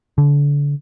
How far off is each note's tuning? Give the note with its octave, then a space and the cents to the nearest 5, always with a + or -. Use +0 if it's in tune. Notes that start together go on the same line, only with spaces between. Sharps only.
D3 -30